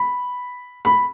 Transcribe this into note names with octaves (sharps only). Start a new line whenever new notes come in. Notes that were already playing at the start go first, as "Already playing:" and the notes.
Already playing: B5
B5